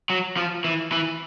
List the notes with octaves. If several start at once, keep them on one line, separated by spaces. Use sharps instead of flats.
F#3
F3
E3
E3